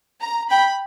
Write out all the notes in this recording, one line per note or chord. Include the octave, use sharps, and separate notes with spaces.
A#5
G5 B5